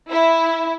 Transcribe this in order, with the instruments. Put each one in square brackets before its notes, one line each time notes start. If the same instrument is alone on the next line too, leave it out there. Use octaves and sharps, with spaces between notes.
[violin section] E4